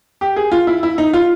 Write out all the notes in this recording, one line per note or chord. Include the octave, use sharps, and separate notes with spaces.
G4
G#4
F4
E4
E4
D#4
F4